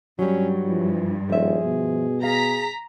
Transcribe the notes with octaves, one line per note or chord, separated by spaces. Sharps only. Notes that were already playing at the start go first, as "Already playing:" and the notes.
G2 F#3 G3 C#4
E3 F3
D#1 F3 G#4 E5
B2
G#4 F5 A#5 B6